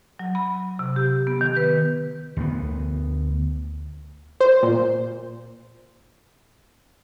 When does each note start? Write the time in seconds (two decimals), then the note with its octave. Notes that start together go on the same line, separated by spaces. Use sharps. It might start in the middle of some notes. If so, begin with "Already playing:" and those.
0.19 F#3
0.35 B5
0.79 C3
0.96 G4
1.27 B3
1.41 D#3
1.57 B4
2.37 D2 B3
4.40 C5
4.63 A#2